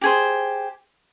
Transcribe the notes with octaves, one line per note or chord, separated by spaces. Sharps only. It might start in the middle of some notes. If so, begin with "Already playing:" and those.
G4 G#4 C5